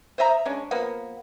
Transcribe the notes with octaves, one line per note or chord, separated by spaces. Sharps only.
C5 D#5 E5 A#5
G#3 C#4 D4
F3 A#3 B3